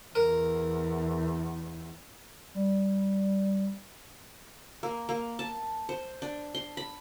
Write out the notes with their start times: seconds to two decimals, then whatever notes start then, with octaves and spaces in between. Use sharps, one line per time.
0.15 E2 A#4
2.54 G3
4.83 A#3
5.09 A#3
5.39 A5
5.89 C5
6.22 D4
6.55 C6
6.77 B5